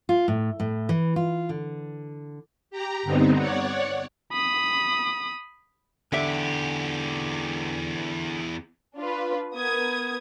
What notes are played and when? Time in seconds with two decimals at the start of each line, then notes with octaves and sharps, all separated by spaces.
0.09 F4
0.28 A2
0.60 A2
0.89 E3
1.16 F4
1.49 D3
2.71 G4 A#5
3.03 G2 D3 B3 C4 D#4
3.38 C#5 D5 F#5
4.32 B5 D#6
6.12 E2 D3 G4 E5
8.96 D4 F4 B4
9.55 B3 A#4 D#6 G#6